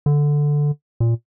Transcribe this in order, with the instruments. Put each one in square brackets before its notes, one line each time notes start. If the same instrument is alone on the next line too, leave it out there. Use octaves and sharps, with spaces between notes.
[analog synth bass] D3
A#2